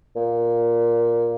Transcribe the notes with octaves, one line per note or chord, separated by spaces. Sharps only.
A#2